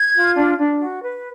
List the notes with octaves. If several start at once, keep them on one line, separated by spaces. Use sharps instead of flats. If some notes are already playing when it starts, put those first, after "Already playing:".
Already playing: G#6
F4
D4
D4
F#4
B4